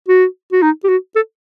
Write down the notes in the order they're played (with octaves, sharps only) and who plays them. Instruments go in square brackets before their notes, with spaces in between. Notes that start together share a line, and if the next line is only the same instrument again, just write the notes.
[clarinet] F#4
F#4
D#4
G4
F#4
A4